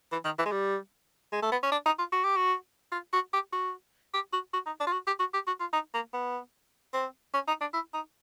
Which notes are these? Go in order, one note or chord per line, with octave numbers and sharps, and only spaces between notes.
E3
D#3
E3
G#3
G3
G#3
A3
B3
C#4
D4
D#4
F4
F#4
G4
F#4
F4
F#4
G4
F#4
G4
F#4
F#4
D#4
D4
F4
F#4
G4
F#4
G4
F#4
F4
D#4
A#3
B3
C4
C#4
D#4
D4
E4
D#4